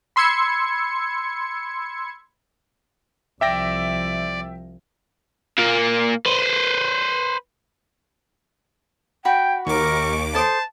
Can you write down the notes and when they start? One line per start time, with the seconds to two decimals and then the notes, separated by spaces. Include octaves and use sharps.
0.16 B5 C6 E6 G#6 C#7
3.41 C2 F3 D5 E5 G5 A#6
5.58 A#2 A#3
6.26 B4 C5
9.25 F#4 F#5 G5 B5
9.66 D#2 A#4 C#6 D6
10.34 A4 C5 A5 D#6